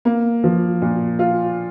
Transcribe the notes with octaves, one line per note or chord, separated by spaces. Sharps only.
A#3
F3
A#2
F4